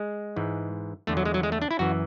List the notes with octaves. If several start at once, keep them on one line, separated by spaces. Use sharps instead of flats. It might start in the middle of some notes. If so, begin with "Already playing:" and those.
Already playing: G#3
G#2 E3
E2 D3 A3
F#3
G#3
F#3
G#3
A3
D4
E4
F#2 E3 F#4